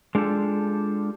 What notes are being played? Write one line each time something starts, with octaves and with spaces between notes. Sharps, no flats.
G#3 D4 F4 G4 A4